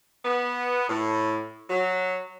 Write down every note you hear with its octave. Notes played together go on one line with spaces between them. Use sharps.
B3
A2
F#3